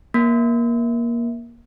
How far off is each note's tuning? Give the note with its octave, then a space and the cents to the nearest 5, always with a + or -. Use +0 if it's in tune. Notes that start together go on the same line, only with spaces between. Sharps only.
A#3 +20